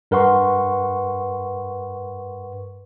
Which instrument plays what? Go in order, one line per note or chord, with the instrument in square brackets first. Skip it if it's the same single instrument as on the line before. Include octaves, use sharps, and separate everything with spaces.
[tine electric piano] G2 A#4 B4 F#5 C6 C#6